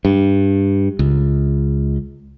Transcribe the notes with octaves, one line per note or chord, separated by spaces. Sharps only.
G2
C#2